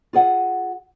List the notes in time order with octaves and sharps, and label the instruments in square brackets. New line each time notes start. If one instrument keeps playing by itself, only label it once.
[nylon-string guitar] F4 G#4 F#5